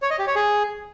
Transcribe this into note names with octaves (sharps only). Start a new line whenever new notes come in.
C#5
D#5
G4
C#5
G#4